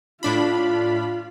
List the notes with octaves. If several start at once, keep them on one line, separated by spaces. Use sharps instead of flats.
A2 D4 F4 B5